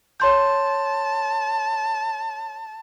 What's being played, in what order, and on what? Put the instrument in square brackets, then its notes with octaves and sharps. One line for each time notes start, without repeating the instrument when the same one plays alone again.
[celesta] C#5 C6 G6 [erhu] A5